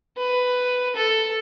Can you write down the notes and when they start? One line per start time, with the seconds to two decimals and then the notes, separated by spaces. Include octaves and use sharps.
0.17 B4
0.96 A4